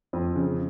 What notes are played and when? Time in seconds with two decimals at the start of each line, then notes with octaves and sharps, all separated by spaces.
0.13 F2
0.36 C#3